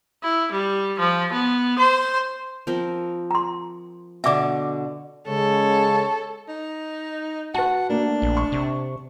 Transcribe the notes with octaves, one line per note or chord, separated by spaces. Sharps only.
E4
G3
F3
B3
C5
F3 C4 A#4
A#5 C6
B2 D3 E5 D6
C#3 G#3 A4 C#5
D#4
F#4 B4 F#5 A5
A3 A#3 D4
A#1
C#6
C3